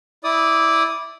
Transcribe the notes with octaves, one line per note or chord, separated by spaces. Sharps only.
E4 D5 D#6